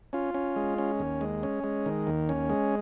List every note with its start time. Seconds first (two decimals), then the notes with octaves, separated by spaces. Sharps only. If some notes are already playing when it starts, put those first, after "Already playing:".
0.13 C#4 F4
0.34 C#4
0.56 G#3
0.78 C#4
1.00 D#2
1.21 G#3
1.43 C#4
1.64 G#3
1.86 D#3
2.07 D#2
2.29 C#4
2.50 G#3